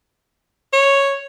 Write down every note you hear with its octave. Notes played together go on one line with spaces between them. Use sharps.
C#5